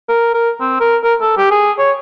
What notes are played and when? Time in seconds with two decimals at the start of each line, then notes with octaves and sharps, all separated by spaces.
0.09 A#4
0.34 A#4
0.60 C4
0.80 A#4
1.04 A#4
1.21 A4
1.37 G4
1.51 G#4
1.78 C#5